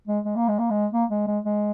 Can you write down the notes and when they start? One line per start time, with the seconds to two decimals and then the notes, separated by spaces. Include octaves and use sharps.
0.08 G#3
0.25 G#3
0.36 A#3
0.48 G#3
0.59 A#3
0.71 G#3
0.93 A#3
1.10 G#3
1.27 G#3
1.45 G#3